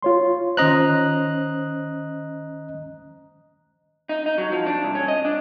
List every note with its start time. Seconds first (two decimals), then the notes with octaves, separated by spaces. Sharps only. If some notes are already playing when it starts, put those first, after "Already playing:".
0.02 F4 C#5 C6
0.57 D#3 C#4 C5 D#5 A#5 F#6
4.09 D#4
4.26 D#4
4.38 F#3
4.52 F3
4.67 D4
4.83 C2
4.95 C#4
5.08 D#5
5.25 D4